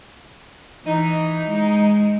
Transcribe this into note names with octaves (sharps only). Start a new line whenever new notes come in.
E3 D#4
G#3